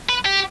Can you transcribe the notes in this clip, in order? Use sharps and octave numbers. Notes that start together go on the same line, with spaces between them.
B4
G4